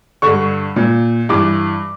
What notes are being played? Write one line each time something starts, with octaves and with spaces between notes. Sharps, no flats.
G2 D3 C#6
A#2
G2 E3 D6